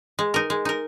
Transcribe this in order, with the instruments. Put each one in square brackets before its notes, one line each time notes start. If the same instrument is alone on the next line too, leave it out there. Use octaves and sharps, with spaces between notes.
[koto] G#3
D#4 A#4
G#3
D#4 A#4